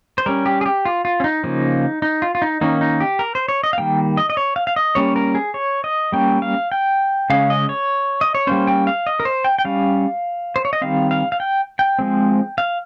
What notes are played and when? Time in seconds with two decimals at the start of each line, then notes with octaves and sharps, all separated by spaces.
0.18 C5
0.26 G3 C#4 A#4
0.46 G4
0.61 G#4
0.66 G4
0.85 F4
1.05 F4
1.20 C#4
1.24 D#4
1.44 C#3 F3 A#3
2.02 D#4
2.22 F4
2.35 F4
2.42 D#4
2.61 D#3 A#3 C#4 D#4
2.81 D#4
3.00 G4
3.19 A#4
3.35 C5
3.48 C#5
3.64 D#5
3.73 F5
3.78 D#3 G3 A#3 G5
4.17 D#5
4.30 D#5
4.37 C#5
4.56 F5
4.67 F5
4.76 D#5
4.95 G3 A#3 C#4 C#5
5.16 A#4
5.35 G#4
5.54 C#5
5.84 D#5
6.12 G3 A#3 C#4 G5
6.42 F5
6.72 G5
7.30 C#3 G#3 C#4 F5
7.50 D#5
7.69 C#5
8.21 D#5
8.35 C#5
8.47 G3 A#3 C#4 C5
8.67 G5
8.87 F5
9.07 D#5
9.20 A#4
9.25 C5
9.44 G5
9.59 G5
9.65 G3 C#4 F5
10.56 C5
10.65 C#5
10.73 D#5
10.82 D#3 G3 C4 F5
11.11 F5
11.32 F5
11.40 G5
11.79 G5
11.99 F3 G#3 C4
12.58 F5